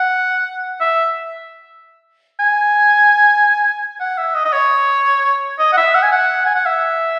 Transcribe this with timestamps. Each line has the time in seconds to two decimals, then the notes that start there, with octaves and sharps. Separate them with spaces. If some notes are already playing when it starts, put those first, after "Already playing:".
Already playing: F#5
0.80 E5
2.39 G#5
4.00 F#5
4.18 E5
4.34 D#5
4.45 D#5
4.53 C#5
5.59 D#5
5.73 F#5
5.77 E5
5.95 F#5
6.03 G#5
6.12 F#5
6.45 G#5
6.55 F#5
6.66 E5